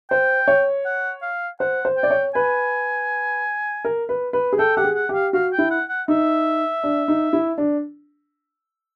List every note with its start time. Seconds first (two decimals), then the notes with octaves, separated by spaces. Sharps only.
0.11 C5 G5
0.48 C#5
0.85 F#5
1.22 F5
1.60 C5 F#5
1.85 C5
1.97 G5
2.03 D5
2.10 C#5
2.34 B4 G#5
3.85 A#4
4.09 B4
4.33 B4
4.53 G#4
4.59 A4 G5
4.77 G4 F#5
4.84 G#4
4.96 F#5
5.09 G4
5.14 F5
5.33 F#4 F5
5.53 G5
5.58 E4
5.71 F#5
5.89 F#5
6.08 D#4 E5
6.83 D4
7.08 D#4
7.33 E4
7.58 D4